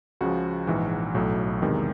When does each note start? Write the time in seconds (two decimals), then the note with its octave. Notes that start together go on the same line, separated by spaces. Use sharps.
0.21 C#2 C#3 F3 F#4
0.67 A#1 G#2 E3
1.14 B1 A2 F#3 A3
1.62 E2 C3 D#3 G#3